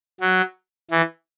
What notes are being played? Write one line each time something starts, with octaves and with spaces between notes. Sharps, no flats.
F#3
E3